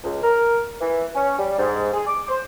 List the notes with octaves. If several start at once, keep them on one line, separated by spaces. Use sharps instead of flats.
C#2
A#4
E3
C#4
G3
G#2
G#4
D6
C5